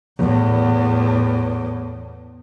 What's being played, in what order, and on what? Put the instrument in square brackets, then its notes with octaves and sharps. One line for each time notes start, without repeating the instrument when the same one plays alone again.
[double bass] E2 A2